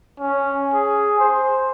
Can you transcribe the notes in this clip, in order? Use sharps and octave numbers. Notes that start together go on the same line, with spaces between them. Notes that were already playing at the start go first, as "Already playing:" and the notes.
C#4
G#4
C5